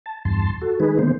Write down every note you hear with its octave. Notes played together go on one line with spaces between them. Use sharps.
A5
E2 G2 A5 C6
F#4 A4
D#3 G#3 D#4 G#4 B4
D3 D#3 A#3 B3 C5